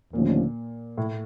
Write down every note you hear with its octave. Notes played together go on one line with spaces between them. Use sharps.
D#2 A#2 D3 F3 A3 C#4
A2